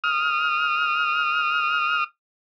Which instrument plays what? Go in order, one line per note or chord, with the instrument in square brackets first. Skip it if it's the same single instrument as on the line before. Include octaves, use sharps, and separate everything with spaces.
[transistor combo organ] D#6 F6